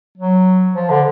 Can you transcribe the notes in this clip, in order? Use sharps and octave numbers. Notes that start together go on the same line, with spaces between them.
F#3
F3
D3